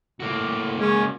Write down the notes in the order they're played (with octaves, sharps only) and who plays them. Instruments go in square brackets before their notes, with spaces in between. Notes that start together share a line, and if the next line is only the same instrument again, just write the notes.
[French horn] A2 [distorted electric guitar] A#3 F#4
[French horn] G#3 [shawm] C#4